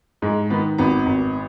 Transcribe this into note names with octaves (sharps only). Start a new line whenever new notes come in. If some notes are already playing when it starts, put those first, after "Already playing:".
G#2 G#3
D#3 B3
G#1 B3
G#1